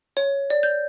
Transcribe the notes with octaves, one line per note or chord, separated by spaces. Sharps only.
C#5
D5
G6